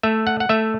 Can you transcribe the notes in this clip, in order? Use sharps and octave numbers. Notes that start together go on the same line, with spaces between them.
A3 E5
F#5
F#5
A3 E5